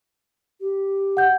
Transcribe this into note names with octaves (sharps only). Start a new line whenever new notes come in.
G4
F#5 G6